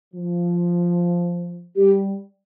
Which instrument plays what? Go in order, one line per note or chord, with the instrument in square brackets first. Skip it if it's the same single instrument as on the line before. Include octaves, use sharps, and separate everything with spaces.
[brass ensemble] F3
[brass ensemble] G3 [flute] G4